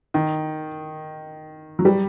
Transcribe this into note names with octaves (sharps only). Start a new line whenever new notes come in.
D#3
F#3
G3